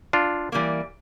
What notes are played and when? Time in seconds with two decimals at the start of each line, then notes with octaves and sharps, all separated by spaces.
0.13 D4 F4
0.52 E3 G3 A#3